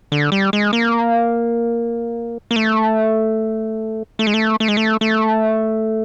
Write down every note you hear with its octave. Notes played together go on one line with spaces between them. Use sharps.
D3
G3
G#3
A#3
A#3
A3
A3
G#3
A3
A3
G#3
A3
A3